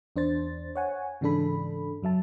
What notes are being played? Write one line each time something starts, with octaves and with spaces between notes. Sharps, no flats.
E2 D4 C5 A6
C#5 F#5 G#5
G#2 C#3 E3 D4 A4 B5
F#2 F#3 E5 A5